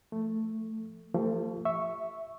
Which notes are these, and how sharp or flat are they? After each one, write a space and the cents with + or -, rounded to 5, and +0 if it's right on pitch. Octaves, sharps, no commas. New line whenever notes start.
F3 -15 A3 +5
F3 -10 A3 +35 G4 +30
E5 +0 C#6 +0